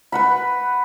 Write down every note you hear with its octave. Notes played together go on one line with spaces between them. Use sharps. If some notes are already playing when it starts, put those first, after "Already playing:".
B4 F#5 B5